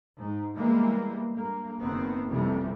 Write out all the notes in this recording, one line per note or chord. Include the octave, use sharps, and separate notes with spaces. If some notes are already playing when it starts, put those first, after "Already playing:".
G#2
E3 G3 G#3 A#3 B3
G2 A#3
F#1 D#3 B3 C4
A1 F2 C3 E3 G3